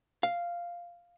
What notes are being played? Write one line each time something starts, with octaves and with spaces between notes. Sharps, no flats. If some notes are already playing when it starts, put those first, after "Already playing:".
F5